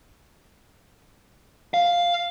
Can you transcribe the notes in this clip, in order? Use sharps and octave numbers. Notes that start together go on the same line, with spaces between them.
F5